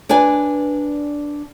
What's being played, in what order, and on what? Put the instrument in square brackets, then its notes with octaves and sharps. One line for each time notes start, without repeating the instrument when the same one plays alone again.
[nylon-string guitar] D4 B4 D5 G#5